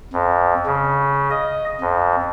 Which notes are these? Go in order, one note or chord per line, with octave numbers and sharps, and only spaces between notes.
F2
C#3
D#5
F2